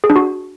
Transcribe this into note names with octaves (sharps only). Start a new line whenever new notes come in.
G#4
D4
F#4